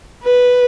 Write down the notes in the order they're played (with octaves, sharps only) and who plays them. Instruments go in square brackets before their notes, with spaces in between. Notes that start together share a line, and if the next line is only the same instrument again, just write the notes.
[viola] B4